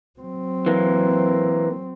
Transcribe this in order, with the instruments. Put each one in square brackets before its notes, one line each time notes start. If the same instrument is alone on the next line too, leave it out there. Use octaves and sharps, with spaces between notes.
[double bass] F#3 C4
[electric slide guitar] E3 A#3